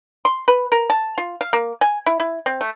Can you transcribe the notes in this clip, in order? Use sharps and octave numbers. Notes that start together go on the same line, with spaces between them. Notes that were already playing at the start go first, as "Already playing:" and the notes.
C6
B4
A#4
A5
F4
F5
A#3
G#5
E4
E4
C4
A3